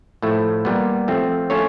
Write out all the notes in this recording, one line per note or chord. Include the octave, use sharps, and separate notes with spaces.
A2 F3 A3
A#2 G3 B3
F3 A3 C4
A3 C#4 F4 A4 C#5